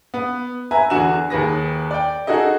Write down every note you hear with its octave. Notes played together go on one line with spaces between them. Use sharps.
B3
B4 E5 G#5 A#5
E2 D3 F#4 G#5 E7
D#2 G#4 B4 A#6
D5 G5
D#4 F#4 G#4 A4 D#5